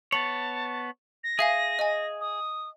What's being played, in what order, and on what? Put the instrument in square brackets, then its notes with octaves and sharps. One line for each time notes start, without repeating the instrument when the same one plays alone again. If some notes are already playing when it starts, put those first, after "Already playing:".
[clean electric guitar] B3 C#5 [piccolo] A5 [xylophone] F#7
[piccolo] A#6
[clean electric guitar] G#4 [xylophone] E5 F5 G#5
[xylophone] D#5 G#5
[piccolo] D#6